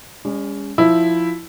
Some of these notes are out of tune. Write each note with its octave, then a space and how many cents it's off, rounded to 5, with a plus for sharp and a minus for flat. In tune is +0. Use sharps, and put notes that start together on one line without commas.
G#3 -40 C#4 +25
F3 +0 E4 +0